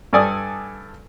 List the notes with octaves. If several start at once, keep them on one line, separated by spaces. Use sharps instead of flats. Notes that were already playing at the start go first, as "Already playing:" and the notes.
G2 A4 D5 G#5 D#6